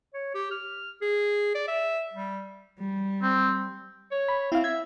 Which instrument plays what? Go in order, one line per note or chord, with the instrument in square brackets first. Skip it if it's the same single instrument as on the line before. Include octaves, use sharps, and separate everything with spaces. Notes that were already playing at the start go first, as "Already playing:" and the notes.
[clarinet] C#5
G4
F6
G#4
D5
E5
G3
[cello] G3
[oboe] C4
[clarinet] C#5
[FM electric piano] B5
[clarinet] C4 [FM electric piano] E4 F5
[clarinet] E5 [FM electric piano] G#6